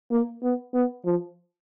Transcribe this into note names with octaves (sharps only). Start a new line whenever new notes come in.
A#3
B3
B3
F3